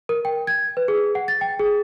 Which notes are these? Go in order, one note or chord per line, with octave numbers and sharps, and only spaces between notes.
A#4
G5
G#6
B4
G#4
F#5
A6
G5
G#4